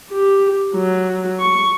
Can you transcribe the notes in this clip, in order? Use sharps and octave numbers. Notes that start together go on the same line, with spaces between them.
G4
F#3
C#6